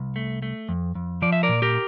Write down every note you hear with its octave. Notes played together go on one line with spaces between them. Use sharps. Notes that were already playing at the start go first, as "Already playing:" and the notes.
Already playing: C2
A3
A3
F2
F2
F3 D5
E5
A#4 D5
A#2
G4 A#4